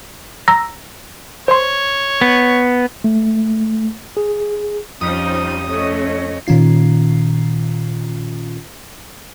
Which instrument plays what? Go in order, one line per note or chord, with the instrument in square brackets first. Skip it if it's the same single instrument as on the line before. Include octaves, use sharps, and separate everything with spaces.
[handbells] A#5 E6 A#6
[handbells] C5 C6 [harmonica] C#5
[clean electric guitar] B3
[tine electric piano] A3
G#4
[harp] F2 B6 [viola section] F3 G3 D#4 [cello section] C#4 [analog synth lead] D#6
[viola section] A3 [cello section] C#4 C#5 D#5
[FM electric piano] A#2 D#3 C#4 F4 C7